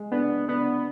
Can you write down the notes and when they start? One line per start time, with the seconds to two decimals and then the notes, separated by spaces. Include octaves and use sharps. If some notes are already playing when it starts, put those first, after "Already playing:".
Already playing: G#3
0.12 B3 D4
0.48 B3 D4